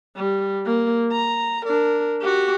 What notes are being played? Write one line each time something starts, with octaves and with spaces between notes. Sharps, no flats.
G3
A#3
A#5
D4 A#4
F#4 G4